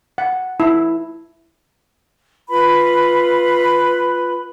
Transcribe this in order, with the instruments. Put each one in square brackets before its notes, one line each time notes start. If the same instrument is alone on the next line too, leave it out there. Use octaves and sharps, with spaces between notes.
[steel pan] F#5
E4
[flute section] F4 B4 B5